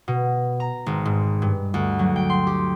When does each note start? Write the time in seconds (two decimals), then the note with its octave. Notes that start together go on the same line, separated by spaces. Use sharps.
0.08 B2
0.60 A#5
0.86 G#1
1.05 G#2
1.42 G2
1.74 D2
1.99 F#3
2.16 G5
2.30 C6
2.47 G4